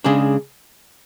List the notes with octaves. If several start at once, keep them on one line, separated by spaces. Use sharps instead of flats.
C#3 G#3 D4 G#4